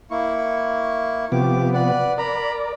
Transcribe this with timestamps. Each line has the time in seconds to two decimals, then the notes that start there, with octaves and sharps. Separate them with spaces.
0.11 A#3 E4 C#6
1.32 C3 F3 B3 G4 D6
1.74 B4 D5 F#5
2.18 A#4 D5 A#5 B5